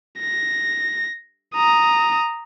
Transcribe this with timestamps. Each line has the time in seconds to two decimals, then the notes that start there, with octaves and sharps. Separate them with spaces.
0.20 A#6
1.55 A#5 D#6